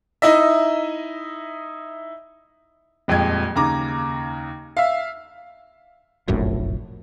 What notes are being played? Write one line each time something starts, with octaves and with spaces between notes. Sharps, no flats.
D#4 E4 D#5 E5
D#1 F2 G#3 G5 G#6
D#2 C#3 A#5 D6
E5 F5
F1 A#1 F#2 A2